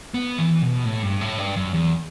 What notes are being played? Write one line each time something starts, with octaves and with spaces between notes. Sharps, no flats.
B3
E3
B2
A2
G2
A2
G2
F#2
E2